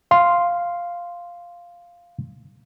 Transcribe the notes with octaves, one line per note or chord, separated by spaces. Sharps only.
F5 C6